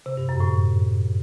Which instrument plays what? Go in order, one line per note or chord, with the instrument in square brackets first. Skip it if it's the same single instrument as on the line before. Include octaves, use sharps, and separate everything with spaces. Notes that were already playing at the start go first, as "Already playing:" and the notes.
[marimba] C3
G2
F#2
A2